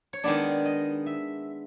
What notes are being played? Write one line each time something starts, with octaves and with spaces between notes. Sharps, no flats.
C#5
D#3 G#3 B3 D4 D5
D#5
E5